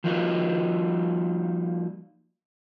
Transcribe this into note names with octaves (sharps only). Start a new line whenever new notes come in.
F3 G3 A#3 D#4 F4 F#4